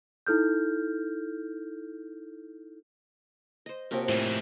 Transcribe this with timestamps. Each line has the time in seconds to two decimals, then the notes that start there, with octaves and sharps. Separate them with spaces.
0.27 D#4 E4 A4 F6 G6
3.66 C5 D#5
3.91 C3 F3 A#3 C4 C#4 F#4
4.09 F2 A2 E3 D#5 G#5